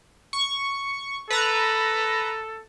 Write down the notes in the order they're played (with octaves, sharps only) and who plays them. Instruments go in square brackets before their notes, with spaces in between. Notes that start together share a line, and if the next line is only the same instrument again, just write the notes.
[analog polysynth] C#6
[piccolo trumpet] A4 [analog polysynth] B4 A#5